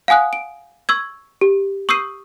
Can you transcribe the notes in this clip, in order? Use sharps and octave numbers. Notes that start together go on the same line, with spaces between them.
F5 F#5 G#5 D#6 F#6
D7
C#6 E6 G#6
G4
C#6 D#6 E6 G6 C7 D#7